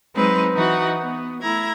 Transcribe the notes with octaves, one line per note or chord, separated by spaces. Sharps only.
F#3 G#3 C4 D#4 B4
E3 D#4 F#4 F#5
B3
A3 E4 A#5 G#6